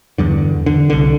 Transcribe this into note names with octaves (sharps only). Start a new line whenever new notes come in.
E2 G2 D3
D3
C2 D3